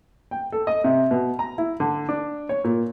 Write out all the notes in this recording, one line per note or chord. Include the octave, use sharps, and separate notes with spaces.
G5
A4
D#5
C3
B2
A#5
E4
D3
D4
C#5
A#2